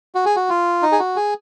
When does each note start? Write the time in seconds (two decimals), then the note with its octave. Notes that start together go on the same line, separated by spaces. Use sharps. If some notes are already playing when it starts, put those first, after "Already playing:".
0.15 F#4
0.26 G#4
0.36 F#4
0.49 F4
0.82 D#4
0.92 G#4
0.99 F#4
1.16 G#4